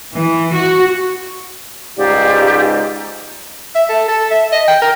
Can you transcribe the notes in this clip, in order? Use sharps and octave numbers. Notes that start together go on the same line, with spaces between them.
E3
F#4
C#2 G#2 G4 D5 F5
E5
A4
A4
E5
D#5
G5
A#4